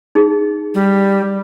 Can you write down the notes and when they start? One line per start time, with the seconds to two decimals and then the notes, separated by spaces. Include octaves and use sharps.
0.15 D#4 G#4
0.74 G3